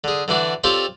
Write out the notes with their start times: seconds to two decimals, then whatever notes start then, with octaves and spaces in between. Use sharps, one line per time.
0.04 D3 G#4
0.28 D3 E3 D4 F#4
0.64 C4 F4 G4 A4 C#5 D5